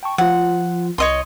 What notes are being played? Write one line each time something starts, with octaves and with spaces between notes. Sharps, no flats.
G5 A5 C#6
F3 F4 F#5
C2 C#5 D#5 C6